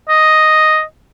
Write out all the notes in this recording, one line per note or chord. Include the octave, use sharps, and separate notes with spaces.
D#5